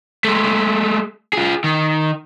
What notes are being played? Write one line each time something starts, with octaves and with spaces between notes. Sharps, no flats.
G#3 A3
F4 G#4
D#3